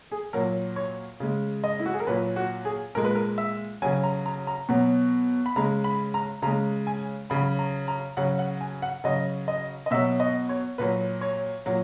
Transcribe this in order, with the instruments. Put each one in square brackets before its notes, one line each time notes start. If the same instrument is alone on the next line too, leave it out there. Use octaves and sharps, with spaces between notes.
[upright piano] G#4
A#2 F#3 A#4
C#5
C#3 G#3
D#5
E4
F#4
G#4
A#4
A#2 F#3 B4
F#4
G#4
A#2 G#3 A#4
B4
A#4
E5
C#3 F#3 G#5
A#5
A#5
A#5
B2 F#3
B5
C#3 G#3 A#5
B5
A#5
C#3 G#3 A#5
G#5
C#3 F#3 B5
A#5
A#5
C#3 F#3 F#5
F#5
G#5
F#5
C#3 F#3 D#5
D#5
D#5
B2 F#3 E5
D#5
C#5
A#2 F#3 B4
C#5
A#2 F#3